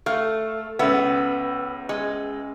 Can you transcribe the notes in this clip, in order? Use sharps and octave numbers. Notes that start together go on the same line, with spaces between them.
A3 F5
C#2 B3 E5
G#3